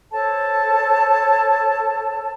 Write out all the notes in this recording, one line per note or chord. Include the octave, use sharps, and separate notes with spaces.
A4 C5 C#5 A5